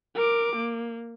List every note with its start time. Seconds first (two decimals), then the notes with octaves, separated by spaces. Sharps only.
0.16 A#4 D6
0.56 A#3